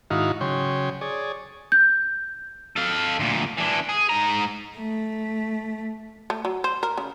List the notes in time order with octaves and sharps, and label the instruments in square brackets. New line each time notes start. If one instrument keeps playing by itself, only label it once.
[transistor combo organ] G#2 D#3 D#4 E4 F#4 F5
C#3 F#3 C#5 G5 C6
G#4 C#5 D5
[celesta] G6
[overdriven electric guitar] A4 F5
D2 A#2
E3 D4
G#4
G#2 A#5
[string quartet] A3
[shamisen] A3
F#3
C5
A#4
C#3